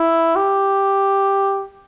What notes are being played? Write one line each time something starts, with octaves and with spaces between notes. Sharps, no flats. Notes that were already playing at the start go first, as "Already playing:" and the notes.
Already playing: E4
G4